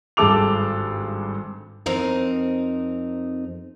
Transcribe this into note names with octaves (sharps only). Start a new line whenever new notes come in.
G#1 G2 G#3 A4 D6 F7
F2 C4 D#4 A#4